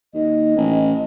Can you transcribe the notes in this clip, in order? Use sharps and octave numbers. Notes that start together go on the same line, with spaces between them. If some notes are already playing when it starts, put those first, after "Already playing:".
D#2 D#5
A1